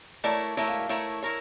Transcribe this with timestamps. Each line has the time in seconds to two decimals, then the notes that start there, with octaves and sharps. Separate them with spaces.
0.24 A3 E4 A#4 C#5 D5
0.57 A3 E4 A#4 C#5 E5
0.68 F5
0.79 F5
0.89 A3 E4 A#4 C#5
1.22 E4 A#4 C#5